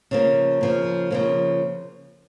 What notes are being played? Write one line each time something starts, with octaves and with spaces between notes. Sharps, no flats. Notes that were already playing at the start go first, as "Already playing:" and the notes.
C#3 F3 A#3
C#3 F3 A#3
C#3 F3 A#3